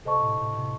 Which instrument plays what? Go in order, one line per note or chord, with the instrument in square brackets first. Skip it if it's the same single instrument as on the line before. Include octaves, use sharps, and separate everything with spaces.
[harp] C3 [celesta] A4 C5 D#5 A5 C#6
[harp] A2
A2
C3